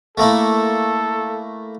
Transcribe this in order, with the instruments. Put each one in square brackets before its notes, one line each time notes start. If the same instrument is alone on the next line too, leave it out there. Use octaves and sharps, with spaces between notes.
[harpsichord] A3 A#3 E4 [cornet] A4